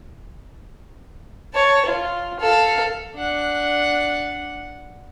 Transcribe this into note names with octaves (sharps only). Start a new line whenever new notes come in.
C#5 A5
F4
A4 F5
D4 F#5